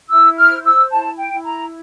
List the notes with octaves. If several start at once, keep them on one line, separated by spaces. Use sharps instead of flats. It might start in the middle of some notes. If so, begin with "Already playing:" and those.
E4 E6
F6
C5
E6
E4 A5
G5
E4
A#5